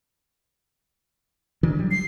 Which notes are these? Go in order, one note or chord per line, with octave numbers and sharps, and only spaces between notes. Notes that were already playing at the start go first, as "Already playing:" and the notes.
D#3 E3 D4
F#3 G3
C7